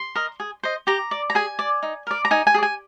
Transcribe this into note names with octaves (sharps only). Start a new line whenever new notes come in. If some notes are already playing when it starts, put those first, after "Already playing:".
Already playing: C6
A#4 D#5
G#4
C5 D#5
G4 A#5
D5
A#5
G#4 G#5
D5
D#4
A#4 D5
A#5
D#4 G#5
G#5
G#4 D5
G#5